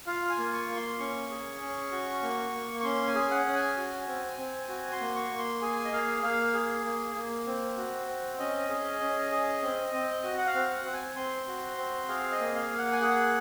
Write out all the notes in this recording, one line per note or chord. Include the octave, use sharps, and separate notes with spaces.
F4 F5
G#5
A#3
C#6
A#3
C6
C#4 C#6
G#4
C#4
F#4
A#3
A#3
C#6
C#4 C6
G#5
G#4
F#5
C#4
G#5
F#4
C4
C4
F#4 G#5
C6
A#3
C#6
A#3
C6
G#4 G#5
D#5
A#3 F5
A#3 F5
G#4
A#3
A#3
C4
F#4
C4
C#4 D#5
G#4
C#4
G#4
C4
C4
F#4
F#5
F5
C4
F#5
C4
G#5
C4 C6
F#4
C4
G#4 F5
D#5
A#3
F5
A#3
F#5
G#5
G#4 F#5